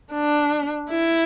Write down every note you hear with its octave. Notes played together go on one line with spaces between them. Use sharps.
D4
E4